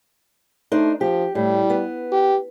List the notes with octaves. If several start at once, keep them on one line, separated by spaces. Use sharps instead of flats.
A3 D4 D#4 C5
F3 G4
A2 G3
B3
G4